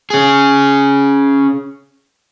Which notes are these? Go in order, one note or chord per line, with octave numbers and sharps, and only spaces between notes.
C#4 G#4